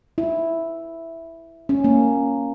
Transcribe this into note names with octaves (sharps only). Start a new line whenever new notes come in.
E4
C#4
A#3